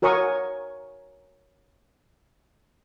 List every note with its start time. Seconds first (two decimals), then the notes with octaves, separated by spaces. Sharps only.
0.02 F#4 A#4 C#5 G#5 C#6 D#6